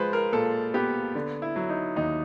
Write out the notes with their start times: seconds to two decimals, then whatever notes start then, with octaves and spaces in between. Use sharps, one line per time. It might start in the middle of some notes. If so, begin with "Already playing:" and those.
Already playing: F3 G#3 B4 C5
0.13 A#4
0.33 A#2 A4
0.74 B3 G4
1.15 D3
1.42 E4
1.56 F#3
1.69 D#4
1.96 D#2 D#4